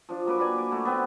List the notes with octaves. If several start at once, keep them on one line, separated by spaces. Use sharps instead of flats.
F3 D4
F#3 A#3 B4 D6
A#3 B4 D5 G#5
D5
A3 F#4
B3 C4 B4